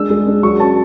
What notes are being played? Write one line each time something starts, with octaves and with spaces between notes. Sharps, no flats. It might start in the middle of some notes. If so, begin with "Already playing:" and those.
Already playing: G#3 D4 E6
G#3
D4
F#3 C#6
C#4 A5